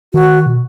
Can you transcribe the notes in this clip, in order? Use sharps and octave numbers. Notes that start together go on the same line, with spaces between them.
D#3 F#4
B2